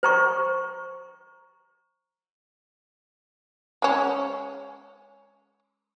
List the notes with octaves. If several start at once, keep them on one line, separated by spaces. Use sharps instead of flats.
C5 A#5 C#6
G#3 C#4